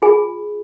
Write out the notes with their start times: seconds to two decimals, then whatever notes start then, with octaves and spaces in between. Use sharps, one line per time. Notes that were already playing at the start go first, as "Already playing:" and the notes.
0.02 F4 G#4 G#5